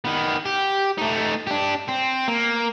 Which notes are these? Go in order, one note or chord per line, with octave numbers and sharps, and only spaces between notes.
D#3 B3
G4
A3 D#4
D4 G4
C4
A#3